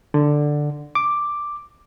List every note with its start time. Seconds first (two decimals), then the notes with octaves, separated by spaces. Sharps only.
0.14 D3
0.95 D6